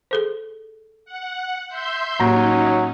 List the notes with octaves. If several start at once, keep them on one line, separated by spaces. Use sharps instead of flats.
G#4 A4 C5
F#5
E5 C6 G6
A2 F#3 A#3 C#4 D#4